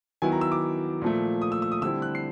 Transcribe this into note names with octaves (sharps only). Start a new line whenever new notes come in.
D#3 F#3 B3 E4 G#5
A#5
E6
D6
A#2 F3 A3
D#6
E6
E6
D#6
D3 G3 C4 E4 E6
F#6
C7